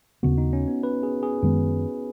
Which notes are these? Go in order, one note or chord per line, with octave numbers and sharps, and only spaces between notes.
D#2 C#3 B3 F#4
D#4
C#4
B3
B4
G#4
G#4
F#2 D#3 G#3 B3